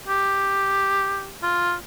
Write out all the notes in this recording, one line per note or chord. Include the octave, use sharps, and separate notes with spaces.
G4
F4